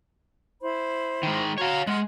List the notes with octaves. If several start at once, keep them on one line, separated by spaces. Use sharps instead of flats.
E4 C5 B5
D#3 G#3
F#4 C#5 F5 A#5 C6
G#3 F#5 C6 F6